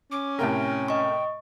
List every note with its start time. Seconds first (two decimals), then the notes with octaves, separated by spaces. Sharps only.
0.12 C#4 D6
0.39 A2 C3 A#4 G5
0.88 D#5 C#6